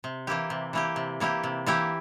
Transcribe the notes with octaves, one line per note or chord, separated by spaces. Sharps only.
C3
E3 A#3 E4 G4
C3
E3 A#3 E4 G4
C3
E3 A#3 E4 G4
C3
E3 A#3 E4 G4